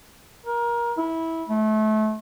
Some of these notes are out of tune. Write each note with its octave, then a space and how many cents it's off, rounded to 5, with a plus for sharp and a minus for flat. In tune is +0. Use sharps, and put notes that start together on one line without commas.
A#4 +25
E4 -15
A3 -30